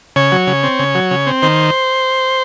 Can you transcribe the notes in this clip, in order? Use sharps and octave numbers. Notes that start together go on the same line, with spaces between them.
C#3 C#5
F#3
C#3
C4
C#3
F#3
C#3
C4
D#3 C5